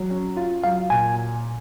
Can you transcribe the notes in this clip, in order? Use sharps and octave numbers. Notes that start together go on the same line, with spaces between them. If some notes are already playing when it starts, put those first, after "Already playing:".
Already playing: F#3
C#4
F4
F#3 F5
A#2 G#5